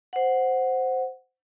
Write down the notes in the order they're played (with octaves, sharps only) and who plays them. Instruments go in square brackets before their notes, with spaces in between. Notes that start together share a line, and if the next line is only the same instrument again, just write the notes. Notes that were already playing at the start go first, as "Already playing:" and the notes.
[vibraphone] C5 F#5